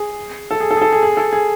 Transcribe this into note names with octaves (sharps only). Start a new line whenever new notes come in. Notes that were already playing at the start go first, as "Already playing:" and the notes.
Already playing: G#4
A4
G#4
A4
G#4
A4
G#4
G#4
A4
G#4